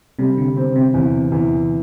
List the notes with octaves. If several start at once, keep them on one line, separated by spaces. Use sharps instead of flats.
C3 G3
D3
C4
C3
E2
E2